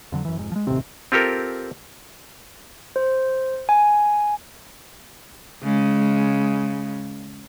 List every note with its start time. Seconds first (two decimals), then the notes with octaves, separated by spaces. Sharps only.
0.12 F2 D3 F#3
0.25 F#2 E3
0.38 F1 G#2
0.52 F3 G#3
0.67 E1 A1 D#2 C3 C4
1.12 C4 F4 G4 A4 A#4
2.96 C5
3.69 G#5
5.63 C#3 G#3